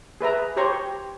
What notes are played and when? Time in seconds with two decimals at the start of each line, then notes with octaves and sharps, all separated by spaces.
0.21 G#4 B4 E5 A#5
0.57 G4 C5 C#5 A#5 C6 C#6